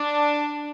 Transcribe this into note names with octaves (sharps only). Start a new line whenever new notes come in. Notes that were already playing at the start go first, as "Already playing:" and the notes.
Already playing: D4